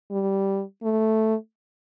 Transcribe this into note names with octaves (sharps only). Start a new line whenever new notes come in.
G3
A3